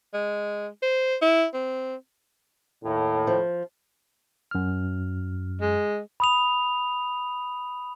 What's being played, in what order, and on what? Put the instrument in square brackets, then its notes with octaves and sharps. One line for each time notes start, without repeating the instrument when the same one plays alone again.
[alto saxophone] G#3
C5
E4
C4
[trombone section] D#2 A2
[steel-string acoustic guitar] F3
[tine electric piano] F#2 F6
[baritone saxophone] G#3
[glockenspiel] B5 D#6 F7